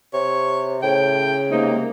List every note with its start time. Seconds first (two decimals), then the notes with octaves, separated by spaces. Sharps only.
0.13 C3 C#5
0.83 A2 C#3 G5
1.51 C3 A#3 D#4